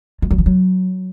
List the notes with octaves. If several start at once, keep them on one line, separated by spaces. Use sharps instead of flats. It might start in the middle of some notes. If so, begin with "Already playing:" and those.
G#3
F#3
F3
F#3